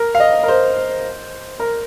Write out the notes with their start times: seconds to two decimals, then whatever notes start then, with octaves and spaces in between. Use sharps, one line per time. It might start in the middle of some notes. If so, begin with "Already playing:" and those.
Already playing: A#4
0.15 F5
0.20 D#5
0.43 A#4
0.48 C5
1.60 A#4